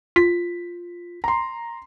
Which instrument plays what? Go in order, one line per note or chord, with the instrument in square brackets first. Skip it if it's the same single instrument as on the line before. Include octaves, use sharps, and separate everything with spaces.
[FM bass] F4 [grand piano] B6
[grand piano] A#5 C6